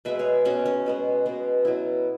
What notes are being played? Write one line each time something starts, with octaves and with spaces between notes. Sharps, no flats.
B2 G#3 B3 B4 E5
G#4 C#5
B2 G#3 B3 C#4 F#4
C#4
B2 G#3 B3
B2 G#3 B3
B2 F#3 B3 E4